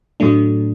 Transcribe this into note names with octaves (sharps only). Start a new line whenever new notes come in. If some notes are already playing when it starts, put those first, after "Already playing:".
A2 F#3 A3 D4